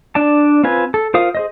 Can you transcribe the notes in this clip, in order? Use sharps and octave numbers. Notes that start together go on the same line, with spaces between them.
D4 D5 A5
C4 F4 B4 G#5
A4
F4 A#4 C5 F5 D#6
G#4 C5 D#5